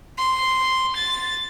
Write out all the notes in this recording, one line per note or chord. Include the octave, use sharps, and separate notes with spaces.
C6
A6